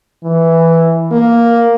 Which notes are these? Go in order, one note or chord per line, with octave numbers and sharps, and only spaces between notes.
E3
A#3